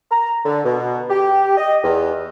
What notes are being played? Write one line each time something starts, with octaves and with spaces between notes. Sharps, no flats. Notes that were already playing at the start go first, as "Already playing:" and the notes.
A#5
D3
B2
G4
D#5
E2